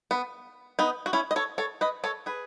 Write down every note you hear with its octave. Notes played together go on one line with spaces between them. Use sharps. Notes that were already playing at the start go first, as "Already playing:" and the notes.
B3
B3 D#4
F#4
C#4 E4
D#5
A4 C#5
A4 C#5
B4 D#5
A4 C#5
G#4 B4